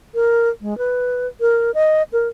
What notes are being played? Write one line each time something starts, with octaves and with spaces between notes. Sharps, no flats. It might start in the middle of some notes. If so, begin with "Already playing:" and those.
A#4
G#3
B4
A#4
D#5
A#4